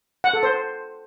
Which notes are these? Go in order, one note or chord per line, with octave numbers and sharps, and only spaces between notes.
F#5
A4
C5